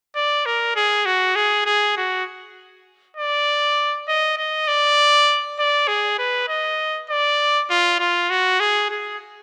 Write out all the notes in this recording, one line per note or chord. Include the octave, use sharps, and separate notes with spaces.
D5
A#4
G#4
F#4
G#4
G#4
F#4
D5
D#5
D#5
D5
D5
G#4
B4
D#5
D5
F4
F4
F#4
G#4
G#4